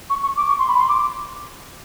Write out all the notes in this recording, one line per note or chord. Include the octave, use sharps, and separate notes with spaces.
C#6
C#6
D6
C#6
C6
B5
C6
D6